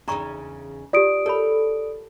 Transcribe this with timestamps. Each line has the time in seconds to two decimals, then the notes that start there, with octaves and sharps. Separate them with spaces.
0.08 E2 C#3 D4 D#4 A#5 C#6
0.93 F4 G4 D5 D#6 D7
1.26 A4 A#4 C#5 B5